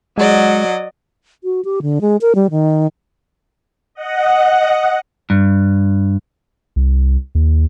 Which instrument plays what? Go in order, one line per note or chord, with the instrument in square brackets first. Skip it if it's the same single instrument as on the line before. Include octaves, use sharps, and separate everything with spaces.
[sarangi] F#3 [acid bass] G#3 [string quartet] D5 D#5
[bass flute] F#4
G4
D3
G#3
A#4
G3
D#3
[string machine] D#5 F#5
[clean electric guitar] G2
[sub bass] C2
D#2